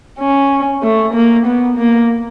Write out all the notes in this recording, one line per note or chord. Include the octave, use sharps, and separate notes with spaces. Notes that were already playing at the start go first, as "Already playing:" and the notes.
C#4
A3
A#3
B3
A#3